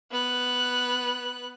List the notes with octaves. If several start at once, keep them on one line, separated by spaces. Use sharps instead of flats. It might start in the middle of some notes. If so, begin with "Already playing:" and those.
B3 F#6